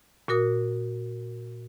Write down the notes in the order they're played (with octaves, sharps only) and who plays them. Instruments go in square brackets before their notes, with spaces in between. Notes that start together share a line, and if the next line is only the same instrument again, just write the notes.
[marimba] A#2 F#4 A#4 D#6